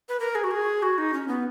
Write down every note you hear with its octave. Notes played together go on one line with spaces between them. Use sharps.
B4
A#4
G#4
F#4
G#4
F#4
D#4
C#4
B3